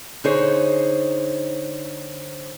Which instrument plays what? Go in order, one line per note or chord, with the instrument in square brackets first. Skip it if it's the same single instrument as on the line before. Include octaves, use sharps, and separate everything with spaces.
[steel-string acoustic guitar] D3 D#4 G#4 C5 C#5